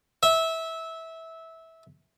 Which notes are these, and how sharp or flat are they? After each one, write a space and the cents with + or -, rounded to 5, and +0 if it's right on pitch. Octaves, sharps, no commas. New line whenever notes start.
E5 -15